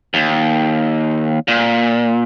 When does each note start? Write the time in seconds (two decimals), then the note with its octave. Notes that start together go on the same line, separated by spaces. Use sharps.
0.14 D#2
1.48 A#2